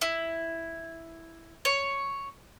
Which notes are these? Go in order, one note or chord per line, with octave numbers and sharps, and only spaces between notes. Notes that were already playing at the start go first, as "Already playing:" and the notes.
E4
C#5